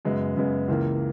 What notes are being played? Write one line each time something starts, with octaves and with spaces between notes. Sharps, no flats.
F#2 C#3 G#3 B3
F#2 C#3 G#3 B3
C#2 C#3 E3 A#3